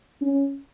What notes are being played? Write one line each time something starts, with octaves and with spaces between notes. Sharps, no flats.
C#4